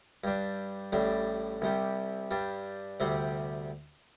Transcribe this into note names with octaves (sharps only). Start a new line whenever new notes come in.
G2 G3 D4
A1 A2 G3 D4
C2 C3 G3
G2 G3 D4
D2 C3 G3 C4